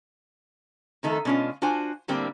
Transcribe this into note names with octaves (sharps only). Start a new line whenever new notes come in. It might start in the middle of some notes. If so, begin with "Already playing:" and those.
F2 D#3 A3 D#4 A4
B2 G#3 C#4 D4 F4
D4 F4 F#4 C5 G#5
A2 D3 G3 A#3 C4